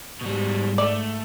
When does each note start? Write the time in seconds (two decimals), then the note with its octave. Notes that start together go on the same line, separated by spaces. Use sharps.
0.21 G#2 B2 G3
0.78 A3 D5